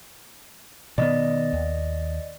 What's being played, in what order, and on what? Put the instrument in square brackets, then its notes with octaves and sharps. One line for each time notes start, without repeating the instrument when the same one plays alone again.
[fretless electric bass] B2 D#3 B3 [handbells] D5 D#5
[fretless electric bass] D#2